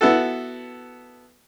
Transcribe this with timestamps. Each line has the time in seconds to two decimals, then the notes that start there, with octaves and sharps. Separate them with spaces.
0.01 B3 E4 F#4 A4